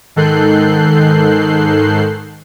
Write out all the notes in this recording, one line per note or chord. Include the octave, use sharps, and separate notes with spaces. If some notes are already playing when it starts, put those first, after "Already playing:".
G#2 D#3 A4 F#6 G6 C7